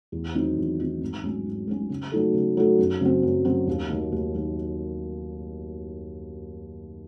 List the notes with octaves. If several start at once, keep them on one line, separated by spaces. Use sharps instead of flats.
E2
D#3 F#3 C4 D#4
E2
D#3 F#3 C4 D#4
G#1
G#2 F#3 C#4
G#1
G#2 F#3 C#4
C#3
F#3 A3 D#4 A4
C#3
F#3 A3 D#4 A4
F#2
C#3 F#3 C4
F#2
C#3 F#3 C4
D#2
D#3 F#3
D#2
D#3 F#3